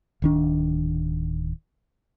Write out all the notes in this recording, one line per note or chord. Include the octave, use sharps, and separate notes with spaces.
D1 D#3 D4